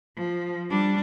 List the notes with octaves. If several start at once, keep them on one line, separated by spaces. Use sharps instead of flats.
F3
G3 D4